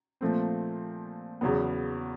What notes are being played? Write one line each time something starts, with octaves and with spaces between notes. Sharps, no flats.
A#2 F3 A3 C4
E2 C#3 F#3 B3